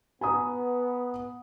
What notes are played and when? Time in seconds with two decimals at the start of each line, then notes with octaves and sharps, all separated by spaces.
0.21 B3 G#5 A#5 D#6